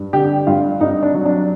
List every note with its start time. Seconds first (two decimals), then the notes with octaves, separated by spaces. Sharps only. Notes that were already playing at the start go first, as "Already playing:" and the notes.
Already playing: G2
0.13 D3 G4
0.47 G2 F4
0.81 G2 D#4
1.03 D4
1.14 F#3
1.26 D4